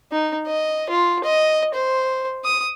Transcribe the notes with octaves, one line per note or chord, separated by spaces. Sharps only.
D#4
D#5
F4
D#5
C5
D#6